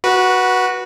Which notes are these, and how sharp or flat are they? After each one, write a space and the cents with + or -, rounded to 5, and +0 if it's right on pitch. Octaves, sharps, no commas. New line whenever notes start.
F#4 +0 B4 -20